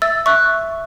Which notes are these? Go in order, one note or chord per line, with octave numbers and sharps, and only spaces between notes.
E5 E6 A6
E5 C#6 F#6